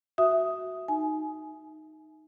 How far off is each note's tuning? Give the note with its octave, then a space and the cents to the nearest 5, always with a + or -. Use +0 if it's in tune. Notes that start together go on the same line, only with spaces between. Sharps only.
F#4 +0 E5 +0 D#6 +5
D#4 +0 G#5 +30